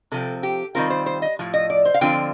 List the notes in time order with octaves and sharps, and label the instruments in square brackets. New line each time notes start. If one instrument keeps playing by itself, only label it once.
[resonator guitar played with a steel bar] C3 F3 C4 A4
G4
D#3 G3 C4 F4 A#4
C5
C5
D#5
A2 F3
D#5
D5
C5
F5
D3 F3 C4 F4 G5